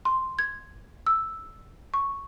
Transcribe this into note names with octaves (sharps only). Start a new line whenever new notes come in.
C6
G#6
E6
C#6